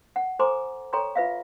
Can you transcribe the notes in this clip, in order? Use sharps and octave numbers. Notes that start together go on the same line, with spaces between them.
F#5
A4 C5 G#5 A#5 C6 D6
A4 C#5 G5 A#5 C6 C#6
F4 B4 E5 F5